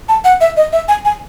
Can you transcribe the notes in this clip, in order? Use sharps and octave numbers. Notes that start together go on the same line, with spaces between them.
A5
F#5
E5
D#5
E5
G#5
G#5